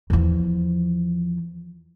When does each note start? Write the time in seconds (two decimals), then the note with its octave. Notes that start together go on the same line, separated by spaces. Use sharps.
0.10 E2 F3